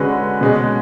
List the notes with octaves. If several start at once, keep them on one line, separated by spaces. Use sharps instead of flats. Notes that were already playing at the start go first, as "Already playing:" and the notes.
Already playing: D3 G#3 C#4 F#4 B4
B2 G#3 C#4